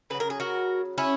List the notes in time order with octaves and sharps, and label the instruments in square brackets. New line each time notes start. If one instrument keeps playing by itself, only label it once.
[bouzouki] C#3 F#3 B4
A#4
G#4
F#4 A#4
C#4 E4